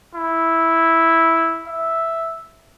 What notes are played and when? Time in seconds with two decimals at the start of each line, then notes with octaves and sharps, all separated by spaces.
0.15 E4
1.68 E5